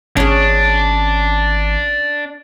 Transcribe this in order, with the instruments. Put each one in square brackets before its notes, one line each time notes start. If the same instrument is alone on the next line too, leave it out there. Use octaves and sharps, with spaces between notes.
[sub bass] G#1 [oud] C#4 G#4 [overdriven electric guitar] D4